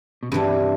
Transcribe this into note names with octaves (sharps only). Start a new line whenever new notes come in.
B2
G2 C3 E3 G3